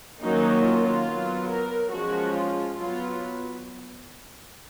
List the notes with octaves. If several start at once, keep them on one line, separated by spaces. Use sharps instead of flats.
D#3 F#3 A#3 C#4 D#4
F4
F#3 B3
A#4
F3 G#3 C#4 F#4
F4
F#3 B3 F4